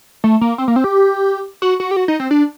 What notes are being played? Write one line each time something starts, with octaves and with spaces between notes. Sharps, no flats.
A3
A#3
C4
A#3
C4
G4
F#4
F#4
G4
F#4
D#4
C4
D4